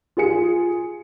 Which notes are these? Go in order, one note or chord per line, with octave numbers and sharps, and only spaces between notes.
F4 G#4 C#7